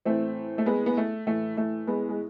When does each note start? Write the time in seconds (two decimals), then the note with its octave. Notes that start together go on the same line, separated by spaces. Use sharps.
0.06 A2 E3 A3 C4
0.58 A3
0.66 G#3 B3
0.86 B3
0.97 A3
1.26 A2 E3 A3
1.57 A3
1.87 G#3 B3
2.09 G#3